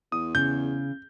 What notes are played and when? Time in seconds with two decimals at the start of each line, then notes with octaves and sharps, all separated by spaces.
0.12 E2 D#6
0.35 C#3 G6